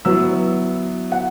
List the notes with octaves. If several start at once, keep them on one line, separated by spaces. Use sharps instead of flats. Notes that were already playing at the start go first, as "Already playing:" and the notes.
F#3 B3 E4 E6
F#5